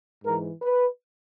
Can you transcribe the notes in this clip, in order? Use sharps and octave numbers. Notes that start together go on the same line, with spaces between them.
G#2 E3 A#4
B4